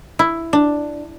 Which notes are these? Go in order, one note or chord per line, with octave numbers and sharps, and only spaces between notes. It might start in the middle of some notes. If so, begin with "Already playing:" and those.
E4
D4